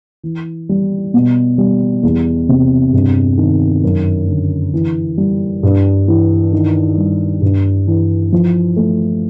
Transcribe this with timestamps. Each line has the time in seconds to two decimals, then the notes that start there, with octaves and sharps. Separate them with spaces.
0.23 E3
0.69 G3
1.14 B2
1.58 G3
2.03 E2
2.49 C3
2.93 G2
3.38 D#3
3.84 F#2
4.27 D3
4.73 E3
5.18 G3
5.63 G2
6.08 E3
6.53 D#3
6.98 G3
7.42 G2
7.87 E3
8.32 F3
8.76 A3